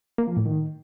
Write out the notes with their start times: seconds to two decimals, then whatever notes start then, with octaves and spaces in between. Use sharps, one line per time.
0.18 A#3
0.27 F3
0.37 A2
0.46 D#3